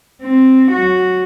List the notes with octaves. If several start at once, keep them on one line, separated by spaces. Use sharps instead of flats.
C4
F#3 F#4